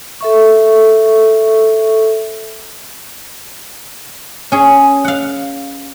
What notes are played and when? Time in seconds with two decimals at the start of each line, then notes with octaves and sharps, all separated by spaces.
0.21 A4 E5 C#6
4.52 C#4 G#4
5.04 F5 F#5